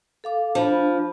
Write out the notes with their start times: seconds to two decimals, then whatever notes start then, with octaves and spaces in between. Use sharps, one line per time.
0.24 A4 F5 D6
0.55 F3 D4 B5